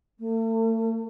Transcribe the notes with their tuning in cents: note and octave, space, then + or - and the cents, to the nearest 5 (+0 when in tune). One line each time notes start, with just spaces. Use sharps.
A3 +40